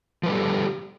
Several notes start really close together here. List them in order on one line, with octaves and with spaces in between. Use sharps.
F3 B4 G3 A4 G4